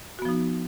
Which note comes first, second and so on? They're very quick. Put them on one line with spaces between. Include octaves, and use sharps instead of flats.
F#4 B3 F3 D#4